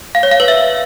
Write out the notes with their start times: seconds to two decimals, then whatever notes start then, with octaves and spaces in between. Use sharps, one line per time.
0.15 F5
0.23 C#5
0.31 F5
0.40 B4
0.48 E5